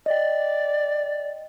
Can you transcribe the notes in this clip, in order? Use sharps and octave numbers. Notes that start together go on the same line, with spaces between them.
D5 D#5 G5